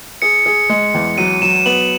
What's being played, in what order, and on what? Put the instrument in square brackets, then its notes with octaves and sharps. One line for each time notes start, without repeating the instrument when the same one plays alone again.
[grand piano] G#4 [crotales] C#7
[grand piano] G#4
G#3
E2
[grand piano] F#3 [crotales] D#7
[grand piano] F#3 [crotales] E7
[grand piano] B3 [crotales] F#7